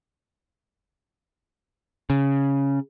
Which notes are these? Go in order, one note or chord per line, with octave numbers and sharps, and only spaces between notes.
C#3